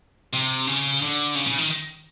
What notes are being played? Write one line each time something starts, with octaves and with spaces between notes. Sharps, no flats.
C3
C#3
D3
C#3
C#3
D#3